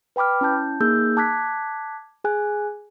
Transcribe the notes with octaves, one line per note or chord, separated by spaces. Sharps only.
B4 G5 B5 D6 F6
C#4 E4 A5 G6
A#3 D#4 G#4 E6 G6
A5 D6 F#6 G#6 B6
G#4 G#5 F#6